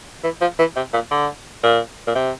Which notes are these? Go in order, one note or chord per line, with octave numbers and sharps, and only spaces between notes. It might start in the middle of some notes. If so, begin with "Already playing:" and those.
E3
F3
E3
C3
A#2
D3
A#2
A#2
C3